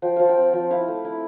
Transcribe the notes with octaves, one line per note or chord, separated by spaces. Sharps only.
F3 G5
F3 F5
G5
C4
F3
E4 F5
A3
E4